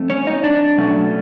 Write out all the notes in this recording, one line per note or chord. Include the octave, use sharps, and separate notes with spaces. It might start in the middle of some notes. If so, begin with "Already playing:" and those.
Already playing: F3 A3 C4
C#4 C#5
D#4 D#5
D4 D5
B2 F#3 A3 C#4